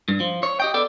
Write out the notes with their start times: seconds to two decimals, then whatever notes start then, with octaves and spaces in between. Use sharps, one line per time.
0.08 G2
0.20 F3
0.43 C#5
0.60 G4 D#5 G5
0.74 B3 A4 D5